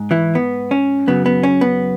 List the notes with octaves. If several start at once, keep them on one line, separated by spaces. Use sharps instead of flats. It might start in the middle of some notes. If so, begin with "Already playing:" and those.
Already playing: G#2
E3 E4
B3
C#4
F#2 C#3 F#3 B3
B3
C#4
B3